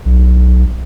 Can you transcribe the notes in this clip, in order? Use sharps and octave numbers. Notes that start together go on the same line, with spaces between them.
B1